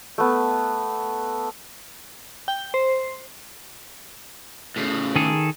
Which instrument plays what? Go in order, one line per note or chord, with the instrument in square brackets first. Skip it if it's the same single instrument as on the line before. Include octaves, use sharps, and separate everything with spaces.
[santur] A3 B3
[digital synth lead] G5
C5
[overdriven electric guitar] A2 C#3
[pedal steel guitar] D#3 G#4 A4